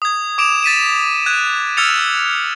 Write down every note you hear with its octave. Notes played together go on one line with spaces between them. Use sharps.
D#6 G#6
D6 D7 E7 F7
A6 B6 D#7 E7
F#6 G#6
E6 F6 G#6 A6 C#7 F7